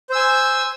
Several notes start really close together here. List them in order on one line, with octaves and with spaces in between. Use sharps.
C5 E6 G#5